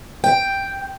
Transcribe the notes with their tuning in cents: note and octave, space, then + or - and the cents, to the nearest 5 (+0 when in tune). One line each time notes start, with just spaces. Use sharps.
G5 +0